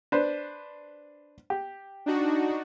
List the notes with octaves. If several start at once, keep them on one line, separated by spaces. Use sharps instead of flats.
D4 B4 C5
G4
D4 D#4 F#4